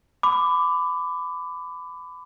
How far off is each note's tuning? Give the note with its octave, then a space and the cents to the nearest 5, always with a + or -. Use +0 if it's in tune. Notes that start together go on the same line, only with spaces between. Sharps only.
B5 +25 D6 +0